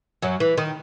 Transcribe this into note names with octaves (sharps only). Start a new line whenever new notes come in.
F#2 F#3
E3
D#3